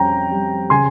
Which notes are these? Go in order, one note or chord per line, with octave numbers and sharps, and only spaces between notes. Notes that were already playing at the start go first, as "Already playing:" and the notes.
Already playing: F2 G3 C#4 G5 A#5
G3
C#3 G#5 C6